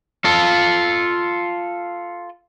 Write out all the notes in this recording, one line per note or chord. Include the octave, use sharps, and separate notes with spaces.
F4 A4